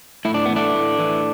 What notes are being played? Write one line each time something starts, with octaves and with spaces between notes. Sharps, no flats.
A2 E4
D4
E3 B3
A3 D4
A2
E3